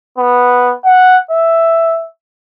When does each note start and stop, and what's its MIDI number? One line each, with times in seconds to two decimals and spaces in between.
0.18 0.73 59
0.85 1.17 78
1.31 2.06 76